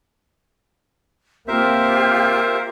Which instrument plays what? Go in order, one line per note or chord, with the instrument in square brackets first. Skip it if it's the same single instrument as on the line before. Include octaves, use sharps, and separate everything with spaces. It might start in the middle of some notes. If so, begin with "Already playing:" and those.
[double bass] A#3 C4 [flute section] F4 G4 [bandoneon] A#4 C5 E5